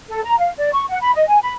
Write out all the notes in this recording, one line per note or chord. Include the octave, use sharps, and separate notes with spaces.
A4
A#5
F5
D5
C#6
F#5
B5
D#5
G#5
B5